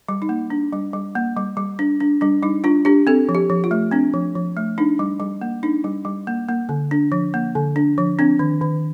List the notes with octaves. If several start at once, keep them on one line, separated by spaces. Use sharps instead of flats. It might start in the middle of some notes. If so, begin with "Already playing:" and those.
G3
D#4
A#3
D4
G3
G3
A#3
G3
G3
D4
D4
G3 D4
G3 D#4
D4 F4
D4 G4
C4 A4
F3
G4
F3
F4
A3
C4 D4
F3
F3
A3
D4 D#4
G3
G3
A#3
D4 D#4
G3
G3
A#3
A#3
D3
D4
F3
A#3
D3
D4
F3
C4 D4
D#3
D#3